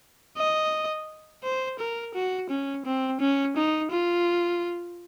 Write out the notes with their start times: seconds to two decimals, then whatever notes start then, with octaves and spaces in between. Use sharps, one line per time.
0.37 D#5
1.43 C5
1.79 A#4
2.14 F#4
2.50 C#4
2.85 C4
3.20 C#4
3.57 D#4
3.91 F4